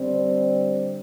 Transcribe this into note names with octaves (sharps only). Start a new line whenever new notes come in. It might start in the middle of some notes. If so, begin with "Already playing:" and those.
Already playing: D3 G3 C4